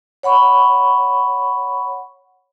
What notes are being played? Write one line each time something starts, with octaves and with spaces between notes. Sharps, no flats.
C#5 F#5 B5 C#6